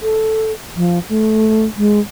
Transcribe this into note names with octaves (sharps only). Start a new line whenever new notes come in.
A4
F3
A3
G#3